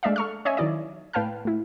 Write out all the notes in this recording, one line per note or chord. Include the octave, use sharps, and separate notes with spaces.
G#3 A3 D4 D5 E5 F5
A4 C#6 F6
C#4 C#5 D#5 E5 G#5
D#3 F#3 E4 D5 D#5
A2 B4 F5 G5 A5 F6
A2 E4